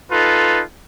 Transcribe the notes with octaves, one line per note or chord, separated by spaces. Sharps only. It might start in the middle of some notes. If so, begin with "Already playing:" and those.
D#4 F4 A4 B4